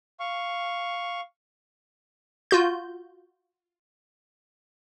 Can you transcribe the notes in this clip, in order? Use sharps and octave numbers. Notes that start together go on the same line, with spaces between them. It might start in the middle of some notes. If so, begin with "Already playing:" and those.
F5 C#6
F4 F#4 G6